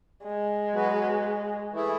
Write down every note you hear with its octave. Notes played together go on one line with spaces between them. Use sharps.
G#3
F#3 B3 F#4 B4
E3 A3 E4 G#4